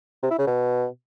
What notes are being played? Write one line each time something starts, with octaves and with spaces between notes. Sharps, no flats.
C3
E4
C#3
B2